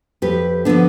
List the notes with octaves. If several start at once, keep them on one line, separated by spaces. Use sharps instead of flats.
F2 G4 B4
D3 F3 B3 D4